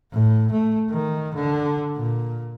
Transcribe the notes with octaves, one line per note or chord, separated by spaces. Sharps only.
A2
A3
D#3
D3
A#2